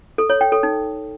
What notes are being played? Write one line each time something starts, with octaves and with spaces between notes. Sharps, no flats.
A4
C#5
G5
A4
D#4